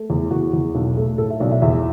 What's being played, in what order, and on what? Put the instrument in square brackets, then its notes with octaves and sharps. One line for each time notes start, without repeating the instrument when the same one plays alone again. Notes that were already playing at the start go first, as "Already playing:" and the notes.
Already playing: [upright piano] A3
E2
E2 F#4
E2
B1
A3
A2 A4
E5
B1 D5
E5
E2 E5